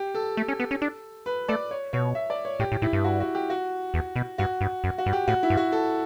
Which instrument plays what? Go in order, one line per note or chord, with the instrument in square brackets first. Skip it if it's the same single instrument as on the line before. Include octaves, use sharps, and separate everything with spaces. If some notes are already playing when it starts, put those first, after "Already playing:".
Already playing: [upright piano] G4
A4
[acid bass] A3
C#4
B3
C#4
D4
[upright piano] B4
[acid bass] A3 [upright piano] D5
[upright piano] C#5
[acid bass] B2 [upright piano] C#5
[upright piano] E5
D5
C#5
[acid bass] A2 [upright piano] G4
[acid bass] A2
[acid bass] A2 [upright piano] E4
[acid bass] G2
[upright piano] F#4
F#4
G4
F#4
[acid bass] E2
B2
[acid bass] G2 [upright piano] F#4
[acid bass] G2
F#2
[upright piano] F#4
[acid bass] G2
[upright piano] G4
[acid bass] A2 [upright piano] F#4
[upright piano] E4
[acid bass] G2
[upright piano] F#4
A4